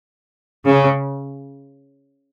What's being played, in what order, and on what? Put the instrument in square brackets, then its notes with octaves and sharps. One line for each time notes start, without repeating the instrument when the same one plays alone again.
[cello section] C#3